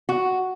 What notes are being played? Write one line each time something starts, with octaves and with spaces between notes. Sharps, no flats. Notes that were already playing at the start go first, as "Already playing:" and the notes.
F#4